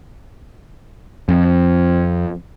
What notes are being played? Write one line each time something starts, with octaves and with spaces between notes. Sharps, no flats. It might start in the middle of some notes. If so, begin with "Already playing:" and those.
F2